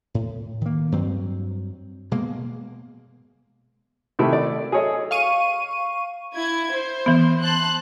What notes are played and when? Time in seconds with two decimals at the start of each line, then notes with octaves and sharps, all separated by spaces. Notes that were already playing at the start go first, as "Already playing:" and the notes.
0.14 A2
0.61 D#3 A#3
0.92 G2 F#3 C4
2.11 B2 G#3 A#3
4.19 C3 D#3 A3 E4
4.33 D5
4.72 G#4 A4 C#5 D#5 E5
5.11 F5 C#6 D#7
6.34 E4 G#6
6.71 C5
7.06 E3 B3
7.42 A5 C6 F#6